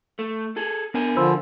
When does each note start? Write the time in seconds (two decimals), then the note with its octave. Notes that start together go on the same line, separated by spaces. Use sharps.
0.19 A3
0.57 G#4 A4
0.94 B3 D4 A#4 G#5
1.17 D3 F3 F4 C5 B5 E6